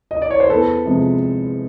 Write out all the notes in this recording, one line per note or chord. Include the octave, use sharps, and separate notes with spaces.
D#5
D5
C#5
C5
E2 A4 B4
C3 F3 G#3